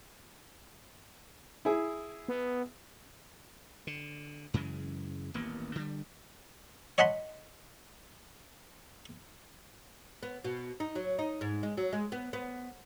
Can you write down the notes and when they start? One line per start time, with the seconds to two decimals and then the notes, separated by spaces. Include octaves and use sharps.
1.65 E4 G#4
2.28 B3
3.87 D3
4.54 F#2 C#3 E3 G#3
5.34 D#1 A1 A#3 B3
5.75 D3 G3
6.98 C#5 D#5 F#5 A5 B5 C6
10.23 B3
10.44 B2
10.80 D#4
10.95 F#3
11.19 D#4
11.41 G#2
11.63 G#3
11.77 F#3
11.93 G#3
12.12 B3
12.33 B3